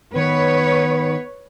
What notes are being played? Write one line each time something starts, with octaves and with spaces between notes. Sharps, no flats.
D#3 B3 B4 C#5